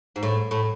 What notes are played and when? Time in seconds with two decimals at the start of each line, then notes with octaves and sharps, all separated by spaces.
0.16 G#2
0.23 A2
0.51 A2